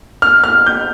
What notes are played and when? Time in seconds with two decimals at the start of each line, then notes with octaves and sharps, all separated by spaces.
0.22 F6
0.44 F6
0.66 G6